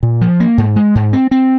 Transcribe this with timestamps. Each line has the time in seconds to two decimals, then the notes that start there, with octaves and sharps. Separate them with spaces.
0.03 A#2
0.21 F3
0.40 A#3
0.58 G#2
0.76 G#3
0.95 G#2
1.13 C4
1.31 C4